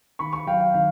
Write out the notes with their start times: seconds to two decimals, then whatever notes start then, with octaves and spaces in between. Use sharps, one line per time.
0.19 D#3 B5 C#6
0.33 B5 C#6
0.47 F#3 F5 G5
0.61 F5 G5
0.74 D#3 F5